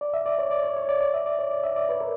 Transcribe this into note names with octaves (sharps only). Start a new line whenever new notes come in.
D5
E5
D5
C#5
D5
C#5
C#5
D5
D5
E5
D5
C#5
D5
E5
D5
B4
A#4